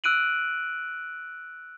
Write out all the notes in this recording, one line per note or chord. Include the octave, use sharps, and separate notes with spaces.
E6 F#6 D7 D#7 F#7